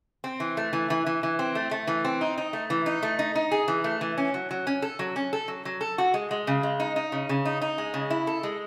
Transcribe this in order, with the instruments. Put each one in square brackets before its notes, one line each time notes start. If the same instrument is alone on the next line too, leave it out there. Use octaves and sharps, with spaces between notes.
[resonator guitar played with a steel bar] C4
E3
A3
E3
E3
E3
E3
C4
A3
A3
E3
C4
D#4
D#4
A3
E3
D#4
A3
D#4
D#4
G#4
E3
A3
E3
C#4
F#3
F#3
C#4
A4
F#3
C#4
A4
F#3
F#3
A4
F#4
G#3
G#3
C#3
G#3
D#4
D#4
C#3
C#3
D#4
D#4
G#3
C#3
E4
A4
G#3